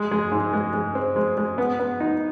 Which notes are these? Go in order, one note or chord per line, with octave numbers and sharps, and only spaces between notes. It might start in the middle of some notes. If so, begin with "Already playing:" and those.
Already playing: G#3
G#3
G#2
G#3
G#3
C4
G#3
G#3
B3
B3
D#4